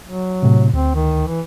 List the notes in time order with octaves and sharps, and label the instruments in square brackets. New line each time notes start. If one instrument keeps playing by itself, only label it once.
[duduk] F#3
[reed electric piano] A2 C3
[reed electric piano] D2 [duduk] C4
[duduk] D#3
E3